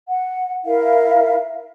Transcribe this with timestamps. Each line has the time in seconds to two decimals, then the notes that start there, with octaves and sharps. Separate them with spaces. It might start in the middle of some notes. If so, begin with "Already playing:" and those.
0.08 F#5
0.66 E4 A#4 E5 F5